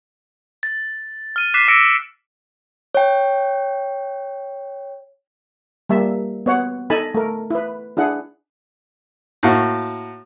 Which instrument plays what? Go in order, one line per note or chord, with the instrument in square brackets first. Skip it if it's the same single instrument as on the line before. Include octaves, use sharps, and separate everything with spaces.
[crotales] A6
F6 D#7
D6 F#6 B6 C7 E7
D6 E6 A#6 C#7 D7
[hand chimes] C#5 G5
[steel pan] G3 A#3 E5
B3 C#5 F#5
D#4 A4 G#5 A5 B5
A3 A#4
E4 B4
D4 E4 G#4 F#5
[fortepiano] A2 A#3 F#4